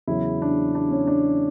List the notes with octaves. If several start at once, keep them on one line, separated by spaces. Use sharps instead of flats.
E2 C#3 F#3 E4
D4
D4
C#4
D4